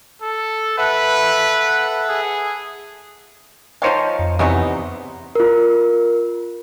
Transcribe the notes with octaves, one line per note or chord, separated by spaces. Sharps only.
A4
A4 B4 E5 F#5
G#4
F3 D#4 C5 C#5 F5 G5
F2
E2 C3 B3 C#4 D#4
F4 A#4